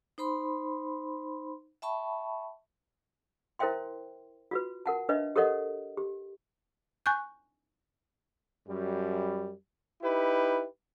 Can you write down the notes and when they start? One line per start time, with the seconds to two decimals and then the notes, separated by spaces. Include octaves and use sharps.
0.18 D#4 C5 B5 C6
1.82 E5 G5 A5 B5 C#6
3.59 E4 A#4 C5 E5 G5 C6
4.51 F4 F#4 B4
4.86 A#4 F#5 A5
5.09 D4 B4 C#5 D#5 E5
5.36 G4 A4 A#4 C#5 D#5 F#5
5.97 G4
7.06 G#5 C#6 F#6 G6
8.67 F#2 G3
10.02 D#4 E4 G4 B4